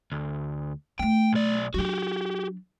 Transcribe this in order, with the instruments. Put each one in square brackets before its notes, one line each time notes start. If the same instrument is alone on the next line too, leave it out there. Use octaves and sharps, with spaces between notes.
[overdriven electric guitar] D2
[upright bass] A3 B3 [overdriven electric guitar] G5
[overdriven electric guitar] B1 D5
[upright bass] F#3 D4 [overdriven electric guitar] F#4 G4